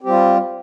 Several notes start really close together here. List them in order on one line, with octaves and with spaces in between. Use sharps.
C4 G4 G3 F4